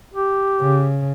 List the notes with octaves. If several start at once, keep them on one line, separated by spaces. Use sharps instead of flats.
G4
C#3